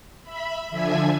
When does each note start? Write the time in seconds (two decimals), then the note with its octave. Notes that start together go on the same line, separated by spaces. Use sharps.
0.23 E5 B5
0.70 D3 F3 D4 E5 G#5 G#6